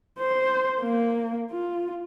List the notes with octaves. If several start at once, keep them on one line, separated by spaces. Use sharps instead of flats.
C5
A#3
F4